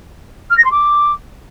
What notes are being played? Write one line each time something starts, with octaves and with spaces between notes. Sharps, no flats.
F6
A#6
C6
D6